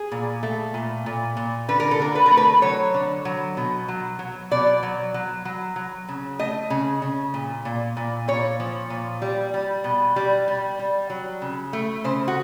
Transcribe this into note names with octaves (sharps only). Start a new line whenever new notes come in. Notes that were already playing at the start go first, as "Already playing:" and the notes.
Already playing: G#4
A#2
A3
A#2
A#2
A#2
D3 B4
A#4
A4
D3 A#4
B4
A#4
A3
B4
F#3 C#5
D3
F#3
B2
F#3
F#3
B2 D5
F#3
F#3
F#3
F#3
C#3
A3 D#5
C#3
C#3
A#2
A#2
A#2
A#2 C#5
F3
A#2
G3
G3
B2
G3
G3
G3
F#3
C#3
A3
C#3 C5
F#4